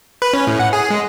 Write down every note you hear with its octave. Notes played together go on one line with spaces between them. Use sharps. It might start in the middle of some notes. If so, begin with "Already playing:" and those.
B4
C#4
A2
F#5
G#4
G#3